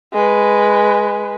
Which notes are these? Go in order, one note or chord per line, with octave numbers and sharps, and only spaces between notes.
G#3 B4